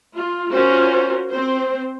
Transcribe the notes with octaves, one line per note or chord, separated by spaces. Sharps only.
F4
C#4 F4 F#4 A#4 C5
C4 C5